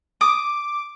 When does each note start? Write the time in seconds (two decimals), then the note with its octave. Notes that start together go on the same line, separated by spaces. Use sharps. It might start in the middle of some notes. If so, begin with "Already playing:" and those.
0.21 D6 D#6